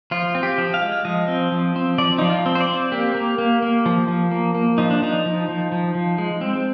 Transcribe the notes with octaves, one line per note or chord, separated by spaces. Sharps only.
F3 F4
C4
G4
F3
F5
G#3
F3 D#5
C4
F3
C4
F3 D5
F3 D#4
F4
C4
C5
D5
C4
A#3 G4
A#3
A#3
A#3
F3
F3
A#3
A#3
F3 D#4
D4
F3 D#4
F3
F3
F3
F3
G#3
C4